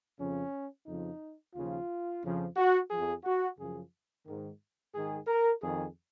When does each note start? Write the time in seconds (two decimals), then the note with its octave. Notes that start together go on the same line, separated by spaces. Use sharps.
0.19 F2 C#3 F3 C#4
0.86 F2 C#3 F3 D#4
1.54 D#2 C#3 F3 F4
2.22 F2 C#3 F3
2.56 F#4
2.90 F2 F3 G#4
3.24 F#4
3.58 F#2 C#3 F3 G#4
4.26 G#2 D#3
4.93 G#2 D#3 G#4
5.27 A#4
5.61 F2 D#3 G#4